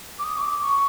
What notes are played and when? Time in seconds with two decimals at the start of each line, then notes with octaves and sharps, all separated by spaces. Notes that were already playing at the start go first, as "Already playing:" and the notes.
0.19 D6
0.24 D#6
0.37 C#6
0.42 D6
0.61 C#6